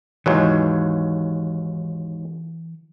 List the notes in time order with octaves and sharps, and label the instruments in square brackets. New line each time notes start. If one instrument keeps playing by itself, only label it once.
[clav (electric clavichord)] D#2 G#2 F#3 [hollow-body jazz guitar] E3